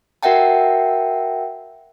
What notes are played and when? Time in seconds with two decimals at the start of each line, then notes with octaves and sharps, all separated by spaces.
0.23 F#4 A#4 E5 F#5 G5 A5